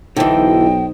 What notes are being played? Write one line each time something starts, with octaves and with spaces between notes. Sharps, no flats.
B1 D3 E3 D#4 C5 D#5 G5